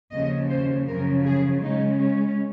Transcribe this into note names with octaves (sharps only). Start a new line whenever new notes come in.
D#2 C#3 F3 D#5
C5
F#2 C#3 F3 A#4
G#4
C#3 G#3 C#4 D#4
C#4